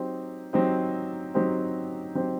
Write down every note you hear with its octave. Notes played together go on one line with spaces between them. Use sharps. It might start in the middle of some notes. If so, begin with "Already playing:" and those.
Already playing: F#3 C4 D#4 G4 C5
F#3 C4 D#4 G4 C5
F#3 C4 D#4 G4 C5
F#3 C4 D#4 G4 C5